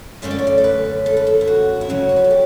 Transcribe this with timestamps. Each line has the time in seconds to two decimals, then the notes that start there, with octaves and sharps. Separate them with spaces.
0.22 F#2 D3 A3 C#4 E5
0.31 D5
0.39 C#5
0.47 D5
0.58 A4
0.64 B4
1.06 A4
1.17 B4
1.27 A4
1.41 E4
1.47 F#4
1.81 E4
1.89 C#3 F#3 C#4 F#4
2.09 C#5
2.16 B4
2.24 A4
2.31 G4